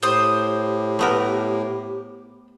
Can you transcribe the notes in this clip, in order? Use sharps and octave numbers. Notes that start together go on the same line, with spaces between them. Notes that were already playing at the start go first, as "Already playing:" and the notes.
A2 G4 C5 D#6
A3 B3 A#4